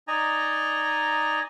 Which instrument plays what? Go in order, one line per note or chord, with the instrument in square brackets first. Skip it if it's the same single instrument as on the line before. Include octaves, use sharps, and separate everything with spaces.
[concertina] D#4 D5 D#5 G#5 A#5